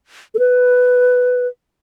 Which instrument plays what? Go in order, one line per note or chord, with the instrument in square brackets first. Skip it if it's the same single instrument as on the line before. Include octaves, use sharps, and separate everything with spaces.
[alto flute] A4
B4